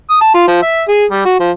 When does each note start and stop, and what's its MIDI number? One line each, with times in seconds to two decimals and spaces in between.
0.10 0.19 87
0.21 0.34 81
0.35 0.44 65
0.48 0.60 53
0.62 0.82 76
0.89 1.04 68
1.11 1.24 55
1.25 1.36 66
1.40 1.51 53